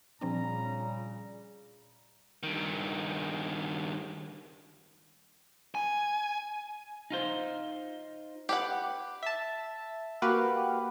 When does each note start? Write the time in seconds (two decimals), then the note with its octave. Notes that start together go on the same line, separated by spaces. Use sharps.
0.21 A#2 C#3 F3 G3 C4 D4 A#5
2.43 G2 D#3
5.75 G#5
7.10 D#4 F4 C5
8.49 G4 B4 F#5
9.23 E5 A5
10.22 A#3 F#4 G4 B4 F5 F#5